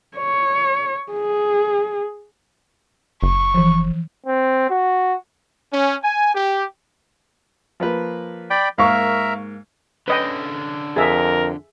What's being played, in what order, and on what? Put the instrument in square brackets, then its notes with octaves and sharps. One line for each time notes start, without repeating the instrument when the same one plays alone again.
[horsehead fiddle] C#5
G#4
[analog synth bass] F#1 [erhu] C#6
[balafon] E3 F3
[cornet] C4
F#4
[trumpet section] C#4
G#5
G4
[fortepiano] F3 A#3 B4
[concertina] D5 G5 B5
[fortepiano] G#2 A#3 [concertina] A#4 E5 [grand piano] F5 C#6
[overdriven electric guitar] D3 C#4 [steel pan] B4 D#5 G5
[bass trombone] F2 [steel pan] G#4 E5 [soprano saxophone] A#4